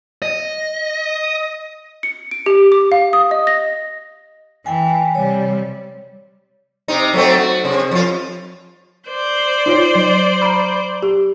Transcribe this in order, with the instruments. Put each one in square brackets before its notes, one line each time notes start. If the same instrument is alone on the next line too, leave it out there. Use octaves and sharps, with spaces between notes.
[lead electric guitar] D#5
[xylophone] C#7
D7
G4
D6
F5
D#6
D#5
A#6
[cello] E3 [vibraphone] G5 G#5
[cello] C3 G3 [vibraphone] C#5
[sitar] C3 D#4
F#3 A3 C4
F#4
C3
F2 F4
[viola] C5 D5
[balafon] D#4 F4 C#5
F#3
A#5 B5
G4